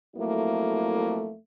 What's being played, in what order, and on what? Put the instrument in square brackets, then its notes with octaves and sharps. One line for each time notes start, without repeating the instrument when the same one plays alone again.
[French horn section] F2 F#3 A3 A#3 E4